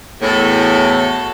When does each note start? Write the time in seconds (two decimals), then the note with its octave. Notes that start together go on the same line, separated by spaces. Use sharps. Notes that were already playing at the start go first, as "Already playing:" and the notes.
0.21 E2 A2 F#4 A4